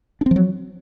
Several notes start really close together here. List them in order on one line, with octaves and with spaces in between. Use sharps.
D4 C4 F3 F#3